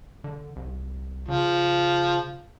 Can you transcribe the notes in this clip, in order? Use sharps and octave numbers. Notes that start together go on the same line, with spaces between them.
D3
C2
C#3 F3